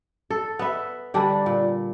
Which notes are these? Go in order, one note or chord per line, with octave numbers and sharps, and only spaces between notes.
A4
B3 E5
D3 G3 D4
A#2